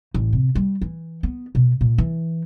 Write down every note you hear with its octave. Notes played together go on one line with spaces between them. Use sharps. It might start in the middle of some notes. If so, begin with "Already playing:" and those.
A1
C3
G3
E3
B3
B2
A#2
E3